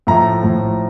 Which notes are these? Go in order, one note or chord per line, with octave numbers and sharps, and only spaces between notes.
A2 F3 A3 A#5
A2 F3 A3